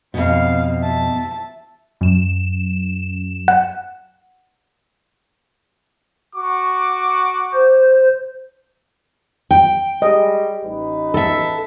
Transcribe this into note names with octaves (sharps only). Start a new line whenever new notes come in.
F2 B2 C4 F5
E5 A5
F#2 E7
F#5
F#4 C#6 D6
C5
G5
G3 G#3 D#5
A1 D#4 B4
A4 E5